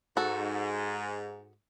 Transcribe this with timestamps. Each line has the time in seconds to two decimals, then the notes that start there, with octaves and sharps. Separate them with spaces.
0.17 G#2 F#4 A4